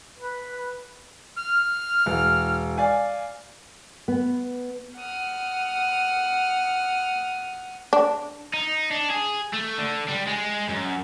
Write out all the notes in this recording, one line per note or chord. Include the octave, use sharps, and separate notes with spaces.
B4
F6
E1
D5 F5 G#5
B3
F#5 D#6 F6
D4
D#4
D4
G#4
A3
D3
G3
G#3
F#2